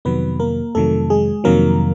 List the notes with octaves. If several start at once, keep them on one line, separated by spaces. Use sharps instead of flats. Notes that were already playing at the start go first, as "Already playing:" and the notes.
F2 C3 D#3 F#3 B3 B4
A#3 A#4
F2 C3 D#3 F#3 A3 A4
G#3 G#4
F2 C3 D#3 F#3 A#3 A#4